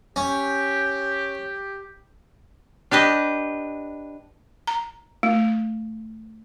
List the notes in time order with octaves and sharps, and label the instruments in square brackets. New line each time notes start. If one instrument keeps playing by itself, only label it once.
[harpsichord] C#4 [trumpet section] G4
[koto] D4 G4 B4 D#5
[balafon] A#5
A3